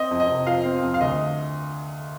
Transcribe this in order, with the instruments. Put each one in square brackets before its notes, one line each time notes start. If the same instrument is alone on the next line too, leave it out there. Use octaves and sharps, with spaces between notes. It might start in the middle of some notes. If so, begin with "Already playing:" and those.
Already playing: [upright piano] C4 D#5
F2
D#5
C3
F3 F5
C4
F2
F5
D2 D#5